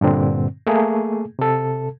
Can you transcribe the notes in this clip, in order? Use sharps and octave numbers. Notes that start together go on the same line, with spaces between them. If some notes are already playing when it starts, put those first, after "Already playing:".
G2 A#2 D3 C4
A3 A#3 G#4
C3 A4